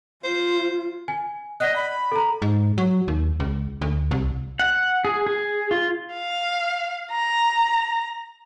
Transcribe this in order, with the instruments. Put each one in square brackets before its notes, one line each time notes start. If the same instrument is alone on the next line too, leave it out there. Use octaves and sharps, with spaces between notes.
[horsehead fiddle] F4 [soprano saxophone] C5
[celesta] G#5
[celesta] D5 F#5 F#6 [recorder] D#5
[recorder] B5
[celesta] A4 A#5
[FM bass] G#2
F#3
D#2
C#2
D2
C2
[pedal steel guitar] F#5
G#4
G#4
F4
[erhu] F5
A#5